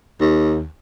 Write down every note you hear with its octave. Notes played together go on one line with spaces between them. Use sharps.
D#2